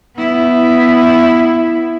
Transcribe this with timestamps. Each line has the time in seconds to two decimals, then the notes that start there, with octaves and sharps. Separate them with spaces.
0.17 B3 E4